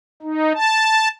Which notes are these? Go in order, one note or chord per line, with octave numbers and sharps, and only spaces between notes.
D#4
A5